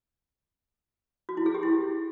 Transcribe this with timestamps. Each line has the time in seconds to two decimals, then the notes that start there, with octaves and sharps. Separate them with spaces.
1.29 F#4
1.37 E4
1.46 G#4
1.54 G4
1.63 E4